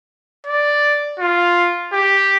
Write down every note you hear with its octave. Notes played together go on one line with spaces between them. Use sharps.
D5
F4
G4